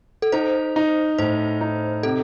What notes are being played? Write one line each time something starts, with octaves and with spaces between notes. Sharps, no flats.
A4
D#4 C5
D#4
A2 C5
D#4
C3 A4